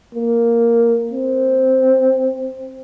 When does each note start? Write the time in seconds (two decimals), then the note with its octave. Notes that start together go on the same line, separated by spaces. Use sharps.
0.15 A#3
1.12 C4